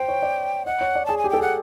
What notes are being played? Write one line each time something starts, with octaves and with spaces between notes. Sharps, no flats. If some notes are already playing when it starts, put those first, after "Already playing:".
Already playing: C5 G5
C#5
D5
D#5 F#5
C#5
D5
G#4 A5
G#5
G4
A4 G5
G#4
F#5